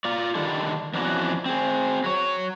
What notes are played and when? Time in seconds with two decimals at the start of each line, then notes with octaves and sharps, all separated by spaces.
0.05 F4 D5
0.35 D3 D#3 G3 A4
0.94 F2 E3 B3 C#4 D4 F#4
1.46 C4 G#4
2.04 F#3 C#5